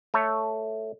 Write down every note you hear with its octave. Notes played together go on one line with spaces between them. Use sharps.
A3 A4 C#5